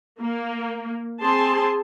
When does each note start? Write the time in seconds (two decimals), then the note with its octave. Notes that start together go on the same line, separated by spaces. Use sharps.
0.20 A#3
1.22 C4 G#4 A5 C6